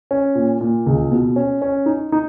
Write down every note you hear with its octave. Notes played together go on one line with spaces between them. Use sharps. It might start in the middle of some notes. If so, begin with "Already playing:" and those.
C#4
A#2
A#2
C#2
B2
C#4
C#4
D#4
D#4